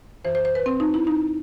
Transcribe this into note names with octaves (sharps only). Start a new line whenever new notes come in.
F#2 E3 C5
C5
C5
B4
C4
D#4
E4
D#4